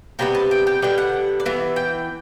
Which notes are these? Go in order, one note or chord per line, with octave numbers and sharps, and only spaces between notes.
C3 G3 B3 G5
A5
G5
G5
D3 G3 B3 G5
F#5
D5
E3 B3 E5
G5